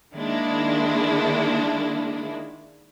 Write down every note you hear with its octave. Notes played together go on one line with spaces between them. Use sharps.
D#3 G#3 A#3 D4 E4